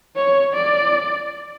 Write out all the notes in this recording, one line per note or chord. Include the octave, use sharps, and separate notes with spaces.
C#5
D5